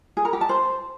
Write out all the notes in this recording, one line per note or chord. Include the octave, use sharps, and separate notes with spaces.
G#4
A#4
G4
A5
C5